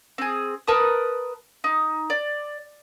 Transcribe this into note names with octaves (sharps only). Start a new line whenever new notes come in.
C4 G#4
A#4 B4 A5 D#6
D#4
D5